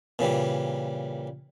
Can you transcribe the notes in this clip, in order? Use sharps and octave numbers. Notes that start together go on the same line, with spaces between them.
A#2 C#3 E3 G3